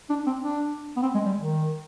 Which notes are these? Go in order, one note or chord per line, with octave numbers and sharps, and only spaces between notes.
D4
C4
D4
B3
C4
G#3
G3
D#3